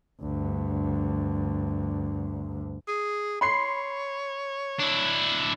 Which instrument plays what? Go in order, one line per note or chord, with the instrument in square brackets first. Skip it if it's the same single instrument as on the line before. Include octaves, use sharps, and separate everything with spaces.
[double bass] D2 G2
[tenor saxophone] G#4
[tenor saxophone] C#5 [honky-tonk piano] B5 C6 C7
[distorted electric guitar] D4 E4